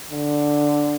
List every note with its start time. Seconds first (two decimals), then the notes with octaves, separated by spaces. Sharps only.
0.11 D3